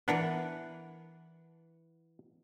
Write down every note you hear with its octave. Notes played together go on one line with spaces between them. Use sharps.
E3 B3 D4 A#4 B4 F#5